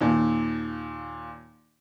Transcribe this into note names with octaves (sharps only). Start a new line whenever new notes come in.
D#2 A#2